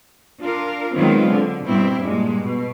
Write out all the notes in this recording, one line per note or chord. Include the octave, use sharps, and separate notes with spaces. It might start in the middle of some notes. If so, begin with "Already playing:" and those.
D4 F4 A#4
D#3 F#3 G#3 B3 C4 F4
D3
G2 B2 C4 E4
G2 A#2 G#3
B2